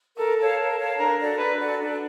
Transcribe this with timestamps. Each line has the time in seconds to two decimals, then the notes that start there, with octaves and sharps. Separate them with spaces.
0.18 A4 A#4
0.38 C#5 F5 A5
0.59 A#4
0.78 C#5 F5 A5
0.98 D4 A#4
1.19 F#4 A4 D5
1.38 D4 B4
1.59 F#4 A4 D5
1.79 D4